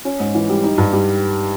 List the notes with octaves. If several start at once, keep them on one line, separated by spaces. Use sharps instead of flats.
C#4
G#2
E3
G3
D#4
G2
G3